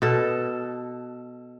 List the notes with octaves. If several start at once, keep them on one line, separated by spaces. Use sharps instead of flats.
B2 A4